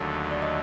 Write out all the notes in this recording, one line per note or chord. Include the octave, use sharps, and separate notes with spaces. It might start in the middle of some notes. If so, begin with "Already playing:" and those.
Already playing: D#2 D3 F#3 A3 C#5
D5
D#5